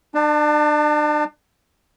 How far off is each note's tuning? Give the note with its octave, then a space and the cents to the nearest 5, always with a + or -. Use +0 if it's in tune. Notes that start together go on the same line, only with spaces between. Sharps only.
D4 +35 A5 +5